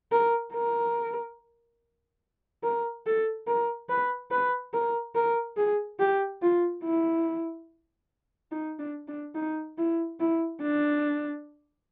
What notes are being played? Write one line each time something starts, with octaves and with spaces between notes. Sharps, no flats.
A#4
A#4
A#4
A4
A#4
B4
B4
A#4
A#4
G#4
G4
F4
E4
D#4
D4
D4
D#4
E4
E4
D4